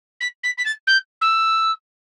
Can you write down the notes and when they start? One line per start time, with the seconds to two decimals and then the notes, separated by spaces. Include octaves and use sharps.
0.20 B6
0.43 B6
0.58 B6
0.65 A6
0.87 G6
1.21 E6